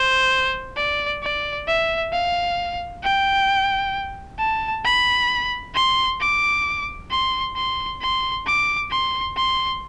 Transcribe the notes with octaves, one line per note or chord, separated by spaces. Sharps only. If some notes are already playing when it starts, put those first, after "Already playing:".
Already playing: C5
D5
D5
E5
F5
G5
A5
B5
C6
D6
C6
C6
C6
D6
C6
C6